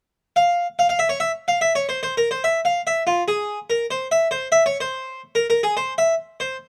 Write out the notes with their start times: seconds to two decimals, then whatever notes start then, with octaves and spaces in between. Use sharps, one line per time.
0.36 F5
0.79 F5
0.89 F5
0.99 E5
1.09 C#5
1.20 E5
1.48 F5
1.61 E5
1.75 C#5
1.89 C5
2.03 C5
2.17 A#4
2.31 C5
2.44 E5
2.65 F5
2.87 E5
3.07 F4
3.28 G#4
3.70 A#4
3.91 C5
4.12 E5
4.31 C5
4.52 E5
4.66 C#5
4.81 C5
5.35 A#4
5.50 A#4
5.63 G#4
5.77 C5
5.98 E5
6.40 C5